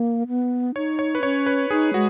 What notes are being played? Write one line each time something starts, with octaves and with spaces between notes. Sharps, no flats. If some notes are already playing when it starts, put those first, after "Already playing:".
Already playing: A#3
B3
D#4 C#5
C#5
B4
C#4 C#5
B4
D#4 G#4
G#3 F#4